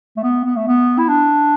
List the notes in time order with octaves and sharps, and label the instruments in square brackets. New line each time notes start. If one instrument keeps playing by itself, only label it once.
[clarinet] A3
B3
B3
A3
B3
E4
D4